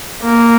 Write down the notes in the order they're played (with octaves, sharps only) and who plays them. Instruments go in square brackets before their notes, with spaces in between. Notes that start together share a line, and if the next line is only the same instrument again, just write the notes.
[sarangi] A#3